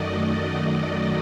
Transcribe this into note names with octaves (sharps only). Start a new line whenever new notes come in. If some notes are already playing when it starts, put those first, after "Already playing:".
Already playing: F#2 D#3 F#3 A3 D5 D#5
D#5